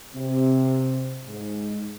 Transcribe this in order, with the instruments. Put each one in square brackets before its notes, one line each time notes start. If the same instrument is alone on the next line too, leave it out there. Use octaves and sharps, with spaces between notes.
[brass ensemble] C3
G#2